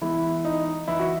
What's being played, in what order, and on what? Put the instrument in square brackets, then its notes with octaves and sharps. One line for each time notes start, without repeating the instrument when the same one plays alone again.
[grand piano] E3 G#3 B3 E4
D#4
E3 E4
F#4